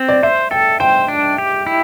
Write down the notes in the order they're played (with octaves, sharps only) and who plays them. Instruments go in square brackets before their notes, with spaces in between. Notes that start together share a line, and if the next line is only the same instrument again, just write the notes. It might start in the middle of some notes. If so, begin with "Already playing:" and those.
Already playing: [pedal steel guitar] C4
[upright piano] D5
[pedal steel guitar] C5 [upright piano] E5
[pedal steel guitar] A4 [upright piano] G5
[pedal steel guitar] C5 [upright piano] G5
[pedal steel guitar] D4
G4
E4